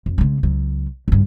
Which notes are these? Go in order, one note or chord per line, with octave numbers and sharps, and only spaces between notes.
F2
C#3 G#3
C#2 F#3
F#1 G2